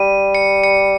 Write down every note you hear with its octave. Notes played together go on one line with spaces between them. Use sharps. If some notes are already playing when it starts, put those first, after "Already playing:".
Already playing: G3 D#7
C#7
C#7